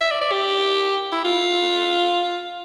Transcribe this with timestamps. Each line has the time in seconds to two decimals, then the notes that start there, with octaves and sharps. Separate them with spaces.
0.01 E5
0.11 D5
0.21 D5
0.31 G4
1.12 E4
1.24 F4